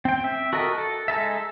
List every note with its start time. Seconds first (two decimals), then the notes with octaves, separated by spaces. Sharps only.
0.05 C4 G5
0.24 E5
0.53 F#4 A4 A#4 D#5
0.78 A4
1.08 G#3 D#4 A4 E5